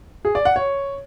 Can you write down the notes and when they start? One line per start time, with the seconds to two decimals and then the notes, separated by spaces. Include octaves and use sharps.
0.25 G#4
0.35 D5
0.45 F#5
0.56 C#5